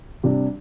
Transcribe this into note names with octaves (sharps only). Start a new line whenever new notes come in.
C3 G3 D4